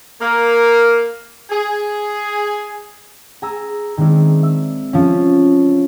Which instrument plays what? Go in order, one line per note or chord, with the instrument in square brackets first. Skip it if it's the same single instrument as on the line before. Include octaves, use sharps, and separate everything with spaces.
[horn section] A#3
G#4
[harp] G#4 G#5 A#5 E6
D#3 G#3 C4 D4 E4
E5 E6
F3 C#4